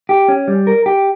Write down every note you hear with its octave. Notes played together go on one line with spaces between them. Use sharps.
G4
C#4
G3
A#4
G4